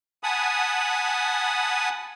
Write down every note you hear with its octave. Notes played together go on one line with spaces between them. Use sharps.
F#5 G#5 A5 B5 D#6